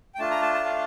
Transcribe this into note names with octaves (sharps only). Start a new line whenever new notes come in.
G5
A3 D4 F4 A5
A#5
A5
A5
F5